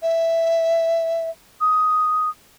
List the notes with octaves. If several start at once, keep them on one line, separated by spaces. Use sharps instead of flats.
E5
D#6